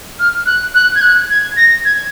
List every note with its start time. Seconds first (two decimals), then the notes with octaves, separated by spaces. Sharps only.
0.19 F6
0.46 F#6
0.74 F#6
0.95 G#6
1.01 F#6
1.30 G#6
1.57 A#6
1.85 G#6